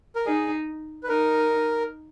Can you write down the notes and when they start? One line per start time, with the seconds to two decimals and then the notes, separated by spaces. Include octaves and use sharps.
0.16 A#4
0.26 D#4 G#4
1.03 B4
1.08 D#4 A#4